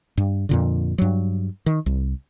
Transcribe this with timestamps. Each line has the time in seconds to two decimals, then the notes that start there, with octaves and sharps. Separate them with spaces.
0.17 G2
0.49 F2 A#2 D3
0.98 G2 F#3
1.66 D#3
1.86 C2